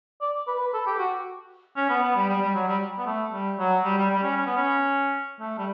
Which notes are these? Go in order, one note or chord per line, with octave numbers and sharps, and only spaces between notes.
D5
B4
B4
A4
G4
F#4
C#4
B3
B3
G3
G3
G3
F#3
G3
B3
A3
G3
F#3
G3
G3
G3
C#4
C#4
B3
C#4
A3
G3